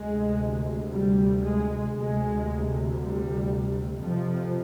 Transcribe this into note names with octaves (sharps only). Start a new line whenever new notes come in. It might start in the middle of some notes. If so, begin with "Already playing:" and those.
Already playing: D2 C3 G#3
G3
G#3
D2 C3 G#3
G3
F2 C3 F3